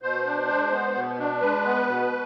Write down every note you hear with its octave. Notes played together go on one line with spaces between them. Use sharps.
B2 C5
D4
G#3
B3
B2
D4
G#3 B4
B3
B2